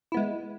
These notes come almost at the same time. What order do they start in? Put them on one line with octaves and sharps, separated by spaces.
E4 B3 G#3